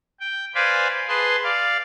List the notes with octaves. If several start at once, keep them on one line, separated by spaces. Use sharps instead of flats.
G5
B4 C5 D5 F5 G#5 B5
G#4 B4 A5 C6
D5 F5